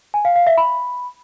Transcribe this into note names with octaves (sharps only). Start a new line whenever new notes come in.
G#5
F5
F5
E5
B5